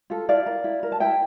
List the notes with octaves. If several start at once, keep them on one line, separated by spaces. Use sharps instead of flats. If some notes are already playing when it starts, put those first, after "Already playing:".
F4 A4
E4 D5 F5
A#4
E4
A#4
A5
E4 E5 G5